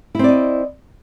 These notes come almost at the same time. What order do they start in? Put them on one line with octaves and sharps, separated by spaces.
E4 C4 D5 D#5